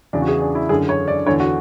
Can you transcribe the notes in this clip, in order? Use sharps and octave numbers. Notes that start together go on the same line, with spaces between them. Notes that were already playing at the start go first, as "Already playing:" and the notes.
E2 C#3 E3 D4
F#4
G#4
D4
E4
F#2 D3 G#4
C#5
D5
E2 D3 C#5
F#4